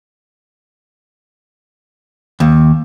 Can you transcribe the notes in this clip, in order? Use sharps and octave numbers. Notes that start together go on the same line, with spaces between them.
D#2